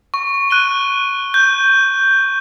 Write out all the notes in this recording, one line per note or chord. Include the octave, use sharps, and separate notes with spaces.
C#6
F#6 D#7 G7
G6